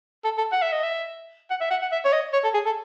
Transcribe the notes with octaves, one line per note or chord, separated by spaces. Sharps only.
A4
A4
F#5
E5
D#5
E5
F#5
E5
F#5
F#5
E5
C#5
D#5
C#5
A4
G#4
A4